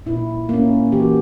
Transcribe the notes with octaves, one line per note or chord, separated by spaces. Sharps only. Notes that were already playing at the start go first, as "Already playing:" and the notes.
A#2 E4
A#3 C#4
E3 G4
F#4